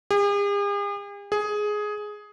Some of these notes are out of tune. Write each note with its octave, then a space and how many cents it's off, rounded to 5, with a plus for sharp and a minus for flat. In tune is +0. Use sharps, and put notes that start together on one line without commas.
G#4 -45
G#4 +10